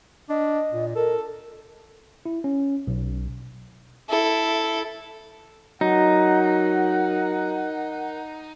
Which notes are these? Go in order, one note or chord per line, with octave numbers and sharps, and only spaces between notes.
D4 D#5
A#2
A4 A#4
E4
C#4
B1
E4 A4
F#3 D#4 A#4 F#5